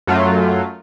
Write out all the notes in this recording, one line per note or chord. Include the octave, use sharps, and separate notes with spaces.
F#2 F#3 A3 F4